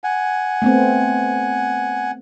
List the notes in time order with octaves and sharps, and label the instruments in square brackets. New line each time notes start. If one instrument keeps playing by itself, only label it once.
[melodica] F#5 G#5
[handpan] A3 B3 C4